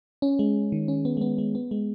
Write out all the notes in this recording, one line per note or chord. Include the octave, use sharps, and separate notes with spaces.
C#4
G#3
D#3
C#4
B3
G#3
B3
G#3
B3
G#3